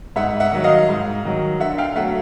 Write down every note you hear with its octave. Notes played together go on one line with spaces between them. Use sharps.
G#2 E5 F#5
E5 F#5
D#3 F#3
D#5 F5
G#2
D#3 F#3
D3 E5 F#5
F5 G5
F#3 A3 E5 F#5